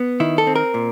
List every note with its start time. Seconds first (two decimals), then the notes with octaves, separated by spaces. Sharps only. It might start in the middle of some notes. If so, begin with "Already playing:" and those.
Already playing: B3
0.20 D#3 E4
0.38 A4
0.47 C4
0.55 A#4
0.74 A#2